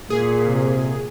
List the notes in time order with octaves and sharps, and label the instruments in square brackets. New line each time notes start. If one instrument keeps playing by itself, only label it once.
[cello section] A#2 [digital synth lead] G#4
[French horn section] C3